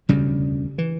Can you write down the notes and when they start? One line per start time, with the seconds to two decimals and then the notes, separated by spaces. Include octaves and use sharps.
0.09 E1 D2 C#3 G3
0.78 E3